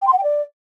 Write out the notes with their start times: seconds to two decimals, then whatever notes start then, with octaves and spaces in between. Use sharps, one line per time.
0.02 G5
0.07 C6
0.12 F#5
0.18 G5
0.23 D5